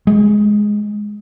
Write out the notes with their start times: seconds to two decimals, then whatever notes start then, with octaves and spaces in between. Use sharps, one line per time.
0.07 G#3